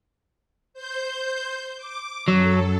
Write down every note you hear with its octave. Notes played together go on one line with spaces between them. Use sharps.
C5 G6
D6
F#2 F#3 A4